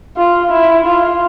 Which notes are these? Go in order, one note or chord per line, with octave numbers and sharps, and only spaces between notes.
F4
E4
F4